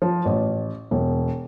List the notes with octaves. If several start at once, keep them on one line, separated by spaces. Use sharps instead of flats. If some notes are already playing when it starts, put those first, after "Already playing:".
F3
A1
E1